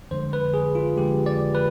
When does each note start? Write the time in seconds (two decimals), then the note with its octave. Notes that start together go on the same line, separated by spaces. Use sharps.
0.11 F2 D3 F3 G#3 C5
0.33 B4
0.54 G#4
0.75 F4
0.97 F2 D3 F3 G#3 G4
1.26 D5
1.55 B4